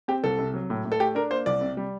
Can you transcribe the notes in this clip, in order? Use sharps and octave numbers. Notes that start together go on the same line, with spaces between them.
C4 G4
C2 A4
C3
F#3
A2
A2
A4
A3 G4
D4 A#4
A#3 C5
C2 D5
C3
G3